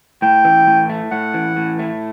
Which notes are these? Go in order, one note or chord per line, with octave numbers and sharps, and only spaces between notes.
A2 G5
E3
A2
A3
A2 F#5
E3
A2
A3